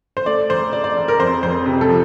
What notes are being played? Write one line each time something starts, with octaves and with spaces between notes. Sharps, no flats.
C5
A3 D5
E1 C5
E1 D5
D5
E1
A#4
F2 C5
F2 C5
C3
A4
F3